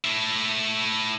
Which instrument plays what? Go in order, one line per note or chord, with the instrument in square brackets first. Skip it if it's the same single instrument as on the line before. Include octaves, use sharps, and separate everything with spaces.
[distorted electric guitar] A3 E4